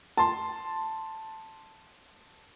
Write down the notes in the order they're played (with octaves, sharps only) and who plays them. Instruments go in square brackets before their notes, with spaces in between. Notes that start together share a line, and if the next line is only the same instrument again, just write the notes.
[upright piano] A5 C6